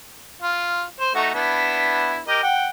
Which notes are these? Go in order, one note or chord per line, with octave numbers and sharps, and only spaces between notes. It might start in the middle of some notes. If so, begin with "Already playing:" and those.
F4
C5
A3 D#4 F#4
B3 D4 E4
G4 A#4 D#5
F#5 G5